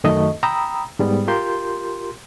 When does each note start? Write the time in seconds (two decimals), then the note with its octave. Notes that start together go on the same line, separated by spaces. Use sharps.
0.04 F#2 D#3 A3 D#5
0.43 G5 A#5 B5 D#6 E6
0.99 G#2 G3 B3
1.28 F4 G4 A#4 C6 G6